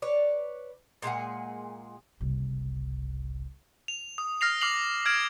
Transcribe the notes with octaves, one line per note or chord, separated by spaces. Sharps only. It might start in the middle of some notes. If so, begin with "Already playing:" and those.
B4 C#5 D5
A#2 G#3 G#4 F#5
F#1 C2
F7
D#6
F6 A#6 C7 F7
D6 F6 C7 F7 F#7
F6 G#6 D7 E7 F#7